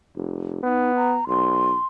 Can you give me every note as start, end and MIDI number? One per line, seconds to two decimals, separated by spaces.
0.16 0.62 29
0.63 1.19 59
0.63 0.91 63
0.96 1.25 82
1.28 1.74 35
1.28 1.86 84